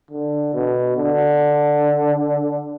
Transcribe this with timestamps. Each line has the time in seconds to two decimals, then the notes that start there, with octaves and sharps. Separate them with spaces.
0.11 D3
0.54 B2
0.96 D3